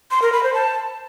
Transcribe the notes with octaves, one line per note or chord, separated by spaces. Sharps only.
C6
A#4
B5
C5
A5